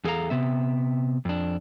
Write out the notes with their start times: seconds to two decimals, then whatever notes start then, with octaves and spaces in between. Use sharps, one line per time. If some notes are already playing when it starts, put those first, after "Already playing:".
0.04 E2 G#4 A4 F5 A#5
0.30 C3 B3 E5
1.25 F2 D4